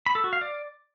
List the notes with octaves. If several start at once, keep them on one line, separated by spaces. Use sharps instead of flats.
B5
A4
F#4
F5
D5